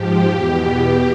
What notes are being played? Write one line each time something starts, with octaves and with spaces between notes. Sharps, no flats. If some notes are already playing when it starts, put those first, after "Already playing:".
Already playing: G#2 F3 G4
E2 B2
E2 B2